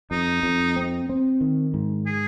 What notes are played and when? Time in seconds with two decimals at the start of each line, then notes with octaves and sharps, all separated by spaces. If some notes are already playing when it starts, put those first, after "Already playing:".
0.11 F2 D#4
0.43 F2
0.76 C4
1.09 C4
1.41 D#3
1.74 G#2
2.07 G#4